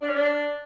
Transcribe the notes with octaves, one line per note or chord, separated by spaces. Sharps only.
D4
C#4
D4